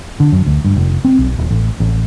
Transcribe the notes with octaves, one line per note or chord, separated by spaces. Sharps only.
D3
F#2
D2
G2
F1
C4
B1
D#1
A1
A1